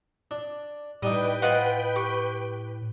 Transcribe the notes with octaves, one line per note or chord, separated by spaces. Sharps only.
D4
A2 G3 D4 D#4 B4 D#5 G5
F4 C5 D#5 F#5 C#6
G4 C#6